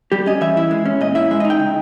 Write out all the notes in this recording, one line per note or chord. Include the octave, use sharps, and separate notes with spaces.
G3 G4
C#4 D#5
E3 E5
E4
G#3
C#4
A#2 D#5
E4 E5
G#3 E5
D#5
D#4
G5
C#3